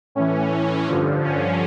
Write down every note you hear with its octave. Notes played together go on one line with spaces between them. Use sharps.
A2 E3 C#4
G2 D3 F3
C#4